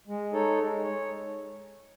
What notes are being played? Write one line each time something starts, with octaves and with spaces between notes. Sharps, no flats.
G#3
D#4 A4 C#5
G#3
C#5